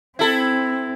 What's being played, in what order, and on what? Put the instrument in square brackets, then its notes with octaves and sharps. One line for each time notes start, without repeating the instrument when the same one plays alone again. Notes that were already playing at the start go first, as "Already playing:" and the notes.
[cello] C4 [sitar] E4 A4